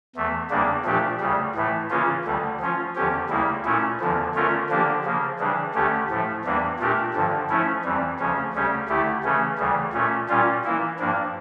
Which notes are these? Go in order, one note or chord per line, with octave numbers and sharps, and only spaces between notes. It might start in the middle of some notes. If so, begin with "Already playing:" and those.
E2 E3 A3
E2 C#3 G3 A#3 D4
A#2 F3 A3 D4 G4
D2 C#3 G3
A2 E3 A3
C#3 E3 A#3 C#4 F4
D2 D3 G3
F3 C#4 F4
E2 D3 F3 C#4 G4
D2 C#3 G3 A#3 E4
A#2 A3 C#4 E4
E2 D3 F3
D3 A3 C#4 F4 A#4
D3 F3 A#3 D4 G4
C#3 F3 A#3
C#3 E3 G3 D4
D2 D3 A3 C#4 G4
A2 F3 A3
E2 E3 G3 A#3 D4
A#2 A3 D4 G4 A#4
G2 D3 F3
F3 A3 C#4 E4
F2 E3 G3
D2 C#3 F3 C#4
D2 C#3 G3 C#4 G4
D2 D3 A3 E4 G4
C#3 E3 A3 C#4
D2 C#3 E3 G3
A#2 A3 C#4
A#2 G3 C#4 F4
E3 A#3 E4
G2 F3 A#3 D4